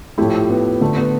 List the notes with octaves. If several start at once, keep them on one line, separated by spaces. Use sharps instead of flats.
A2 F3 A3 E4 G4
B3
D3 A3
B3